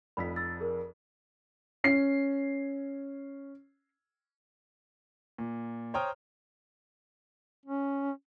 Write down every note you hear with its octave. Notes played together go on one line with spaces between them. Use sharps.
F1 F2 B5 B6
E6 A6
G#4 A#4
C#4 C7
A#2
C5 C#5 G5 A#5 D#6 F6
C#4